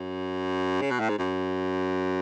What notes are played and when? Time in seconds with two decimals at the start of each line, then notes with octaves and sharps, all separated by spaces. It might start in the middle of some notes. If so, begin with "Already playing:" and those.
Already playing: F#2
0.81 C#3
0.91 B2
1.00 A2
1.09 G#2
1.18 F#2